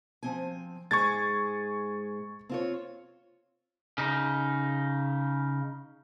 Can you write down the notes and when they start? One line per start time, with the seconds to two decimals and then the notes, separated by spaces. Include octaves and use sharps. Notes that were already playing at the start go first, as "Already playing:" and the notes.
0.23 F3 C4 G#5
0.91 G#2 G#3 G#4 C#6 G#6 A6
2.49 C4 F4 C#5
3.98 C#3 D#4